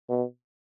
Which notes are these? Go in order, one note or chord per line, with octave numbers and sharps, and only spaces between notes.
B2